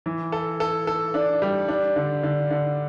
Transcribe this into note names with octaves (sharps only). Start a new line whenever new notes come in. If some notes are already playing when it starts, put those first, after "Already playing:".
E3
A4
A4
A4
D4
G3
D4
D3
D3
D3